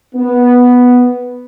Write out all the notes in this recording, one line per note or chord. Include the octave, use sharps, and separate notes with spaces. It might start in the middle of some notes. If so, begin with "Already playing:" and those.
B3